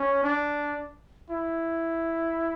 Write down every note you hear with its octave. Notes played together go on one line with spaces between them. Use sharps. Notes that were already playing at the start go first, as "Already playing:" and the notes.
Already playing: C#4
D4
E4